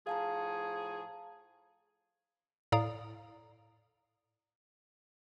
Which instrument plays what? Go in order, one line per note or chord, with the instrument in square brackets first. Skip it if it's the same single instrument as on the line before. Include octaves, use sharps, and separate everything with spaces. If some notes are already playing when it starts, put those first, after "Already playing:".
[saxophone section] A2 F3 G#4 [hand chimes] F5 A5 A#5
[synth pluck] A2 D5 F5 A#5 D#6